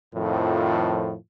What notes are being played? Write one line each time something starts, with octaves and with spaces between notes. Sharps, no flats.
F2 A2 D#3 F3